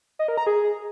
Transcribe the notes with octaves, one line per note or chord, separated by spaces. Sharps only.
D#5
A#4
A#5
G#4